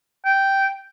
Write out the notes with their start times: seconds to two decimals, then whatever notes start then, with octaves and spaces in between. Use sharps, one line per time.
0.25 G5